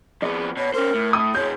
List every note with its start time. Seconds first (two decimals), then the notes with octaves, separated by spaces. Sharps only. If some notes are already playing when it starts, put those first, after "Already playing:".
0.22 F2 B3 G#4 D5
0.57 B2 C#5
0.74 C#4 A#4 C5
0.94 A2
1.13 D#6
1.35 B2 G#3 C#5 G6